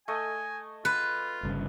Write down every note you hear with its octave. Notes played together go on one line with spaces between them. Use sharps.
A3 D#5 G#5
F4 B4
G1 G2 C#3